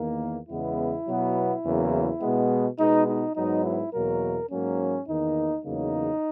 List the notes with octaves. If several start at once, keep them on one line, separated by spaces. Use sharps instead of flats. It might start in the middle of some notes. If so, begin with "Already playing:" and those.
Already playing: E2 D#3 A#3
E2 C#3 G#3 B3 E4
B2 F#3 B3
E2 C#3 F#3 A#3
B2 G#3 B3
B2 G#3 B3 D#4
D#4
G#2 F#3 B3 D#4
E4
E2 B2 F#3 A#3 A#4
G#2 F#3 A#3 C#4
E2 D#3 A#3 D#4
E2 C#3 F#3 A#3 D#4